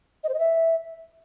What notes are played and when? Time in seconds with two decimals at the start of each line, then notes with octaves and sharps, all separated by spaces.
0.24 D#5
0.29 C5
0.34 D#5
0.39 E5